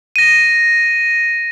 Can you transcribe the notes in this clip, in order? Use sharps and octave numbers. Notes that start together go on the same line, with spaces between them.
A#6 D#7